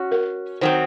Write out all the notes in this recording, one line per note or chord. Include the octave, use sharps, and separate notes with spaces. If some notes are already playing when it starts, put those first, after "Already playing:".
Already playing: C#4 F#4
A#4
D#3 F#3 C4 C5